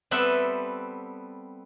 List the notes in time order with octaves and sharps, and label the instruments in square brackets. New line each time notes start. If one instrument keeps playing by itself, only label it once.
[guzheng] G3 B3 C4 A4 B4 E5